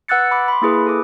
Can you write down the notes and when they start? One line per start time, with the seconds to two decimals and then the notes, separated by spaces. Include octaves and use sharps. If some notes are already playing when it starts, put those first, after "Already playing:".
0.08 B4 F#5 E6 F#6 A6 C#7
0.31 B5 D6
0.48 B5 C6
0.62 A#3 E4 G#4 B4
0.87 A4 D6